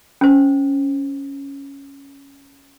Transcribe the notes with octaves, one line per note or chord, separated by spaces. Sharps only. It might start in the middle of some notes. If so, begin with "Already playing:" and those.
C#4 C5